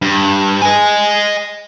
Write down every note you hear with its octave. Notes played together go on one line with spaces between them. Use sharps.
G2
D#5 G#5